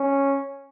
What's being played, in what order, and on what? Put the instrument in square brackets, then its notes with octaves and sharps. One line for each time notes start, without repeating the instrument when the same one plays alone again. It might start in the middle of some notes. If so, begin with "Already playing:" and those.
Already playing: [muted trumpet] C#4